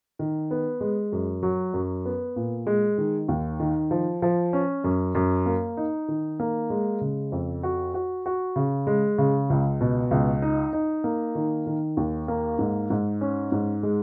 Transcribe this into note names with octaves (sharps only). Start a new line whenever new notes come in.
D#3
B3
G#3
F#2
F#3
F#2
B3
A#2
G#3
D#3
D#2
D#3
F3
F3
C#4
F#2
F#2
A#3
D#4
D#3
A#3
G#3
C#3
F2
F#4
F#4
F#4
C#3
G#3
C#3
C#2
B2
C#2
D#4
D#4
A#3
D#3
D#3
D#2
A#3
G#2
G#2
C#4
G#2
G#3